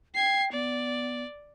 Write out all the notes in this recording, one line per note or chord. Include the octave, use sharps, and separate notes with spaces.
G5 G#6 C7
B3 D5